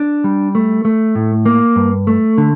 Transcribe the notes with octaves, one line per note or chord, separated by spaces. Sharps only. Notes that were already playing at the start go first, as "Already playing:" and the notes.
Already playing: D4
G3
A3
A3
A2
A#3
G2
A3
D3